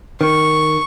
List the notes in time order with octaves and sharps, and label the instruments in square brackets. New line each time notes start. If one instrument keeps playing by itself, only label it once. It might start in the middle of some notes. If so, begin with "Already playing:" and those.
[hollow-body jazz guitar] D#3 [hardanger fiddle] C#6